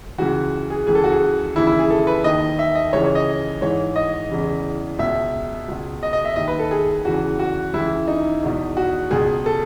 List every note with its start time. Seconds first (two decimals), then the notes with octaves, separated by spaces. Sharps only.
0.18 C#2 C#3 E3 F#4
0.70 G#4
0.87 C#2 C#3 E3 G#4
0.95 A4
1.04 F#4
1.12 G#4
1.56 D#2 C#3 E3 E4
1.67 E4
1.79 G#4
1.90 A4
2.07 B4
2.24 D#2 D#3 D#5
2.59 E5
2.75 D#5
2.93 C#2 C#3 E3 C#5
3.04 C#5
3.15 D#5
3.61 G#2 E3 C#5
3.96 D#5
4.30 E2 C#3 E3
4.99 C#2 B2 E5
5.68 C#2 B2
6.03 D#5
6.13 D#5
6.25 E5
6.36 D#2 D#3 D#5
6.48 B4
6.59 A4
6.71 G#4
7.05 E2 C#3 E3 F#4
7.39 F#4
7.74 C#2 C#3 E3 E4
8.08 D#4
8.43 E2 B2
8.77 F#4
9.11 C#2 B2 G#4
9.46 A4